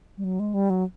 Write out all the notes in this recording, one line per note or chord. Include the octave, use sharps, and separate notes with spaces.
G3
F#3
G#3
G3
F#3